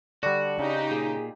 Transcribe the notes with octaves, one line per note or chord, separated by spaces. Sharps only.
D3 G3 D4 F#4
C#3 D#4 G4
A#2 G#4